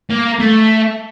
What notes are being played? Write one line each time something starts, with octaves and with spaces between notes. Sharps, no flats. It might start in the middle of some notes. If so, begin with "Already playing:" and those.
A#3
A3